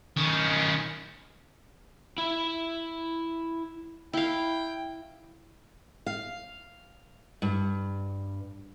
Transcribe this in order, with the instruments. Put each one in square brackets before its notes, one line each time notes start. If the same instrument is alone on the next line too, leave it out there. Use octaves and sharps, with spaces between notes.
[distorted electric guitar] D#3 C#4
[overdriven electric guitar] E4 B5
[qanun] E4 F5 [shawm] G5
[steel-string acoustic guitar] F5
G2